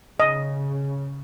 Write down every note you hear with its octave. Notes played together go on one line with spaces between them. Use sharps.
C#3 D#5